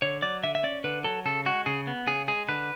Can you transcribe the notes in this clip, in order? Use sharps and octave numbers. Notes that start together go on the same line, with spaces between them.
D3 C#5
F#3 D5
D3 E5
E5
C#4 D5
D3 B4
F#3 A4
C#3 A4
G#3 F#4
C#3 G#4
B3
C#3 G#4
G#3 G#4
D3 B4